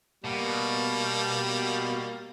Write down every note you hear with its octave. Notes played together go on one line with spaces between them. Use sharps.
B2 G3 A#3